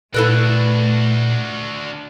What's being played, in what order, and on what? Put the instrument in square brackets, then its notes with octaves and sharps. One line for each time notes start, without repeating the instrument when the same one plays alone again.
[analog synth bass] A#2 [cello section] A3 [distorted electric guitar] D4 F#4 [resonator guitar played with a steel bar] E4 A4 B4